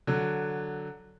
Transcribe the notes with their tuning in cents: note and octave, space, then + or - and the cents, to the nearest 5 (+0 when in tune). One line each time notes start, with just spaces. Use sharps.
D3 +0 F#3 +0